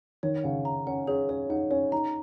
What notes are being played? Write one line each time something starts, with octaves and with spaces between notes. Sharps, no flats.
D#3 C#5
C#3 F#5
A#5
C#4 F#5
C#4 G#4
C#4 C#5
D#4 F#5
C#4 C#5
D#4 A#5